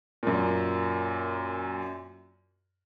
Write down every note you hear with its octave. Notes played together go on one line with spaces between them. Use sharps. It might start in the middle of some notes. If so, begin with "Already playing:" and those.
F#2 A#2